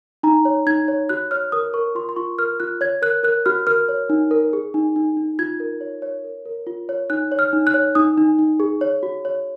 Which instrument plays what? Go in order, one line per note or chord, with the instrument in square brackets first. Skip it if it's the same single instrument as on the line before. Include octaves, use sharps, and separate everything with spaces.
[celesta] D#4 A#5
C#5
D#4 G#6
C#5
F#4 F#6
C#5 F6
A#4 D#6
A#4 C#6
F4 C6
C6
F4 C#6
A#4 F6
F4 F#6
C#5 G#6
A#4 F#6
A#4 F#6
F#4 F6
A#4 F6
C#5
D#4
A#4
G#4
D#4
D#4
D#4
F4 G#6
A#4
C#5
C#5
A#4
A#4
F4
C#5
D#4 F#6
C#5
F6
D#4
F#6
C#5
D#4 D#6
D#4
D#4
G#4
C#5
F#4
C#5